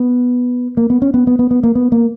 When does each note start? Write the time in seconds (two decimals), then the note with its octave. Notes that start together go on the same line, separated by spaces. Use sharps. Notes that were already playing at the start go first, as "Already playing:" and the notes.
Already playing: B3
0.77 A#3
0.90 B3
1.02 C#4
1.14 B3
1.27 B3
1.39 B3
1.51 B3
1.63 A#3
1.75 B3
1.92 A#3